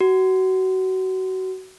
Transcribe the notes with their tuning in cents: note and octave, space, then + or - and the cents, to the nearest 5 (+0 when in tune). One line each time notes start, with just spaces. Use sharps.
F#4 +25